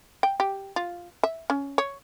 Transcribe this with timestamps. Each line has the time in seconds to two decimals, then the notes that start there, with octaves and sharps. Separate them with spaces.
0.23 G5
0.40 G4
0.76 F4
1.23 E5
1.50 C#4
1.78 C#5